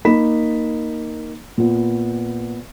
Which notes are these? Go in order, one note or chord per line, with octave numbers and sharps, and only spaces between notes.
A#3 D#4 B5 B6 E7
A#2 B3